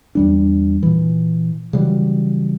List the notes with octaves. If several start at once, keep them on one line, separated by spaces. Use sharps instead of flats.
E2 G3 D4
A#2 E3
C#3 E3 F#3 G3